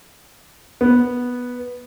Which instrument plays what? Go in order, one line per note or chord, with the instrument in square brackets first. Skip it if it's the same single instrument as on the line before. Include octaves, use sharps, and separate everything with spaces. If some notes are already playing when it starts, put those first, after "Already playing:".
[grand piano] B3